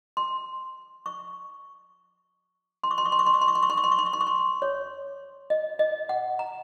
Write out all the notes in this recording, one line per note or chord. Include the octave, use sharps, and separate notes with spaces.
C6
C#6
C6
C#6
C6
C#6
C6
C#6
C6
C#6
C6
C#6
C6
C#6
C6
C#6
C6
C#6
C6
C#6
C6
C#6
C6
C#5
D#5
D#5
F#5
A#5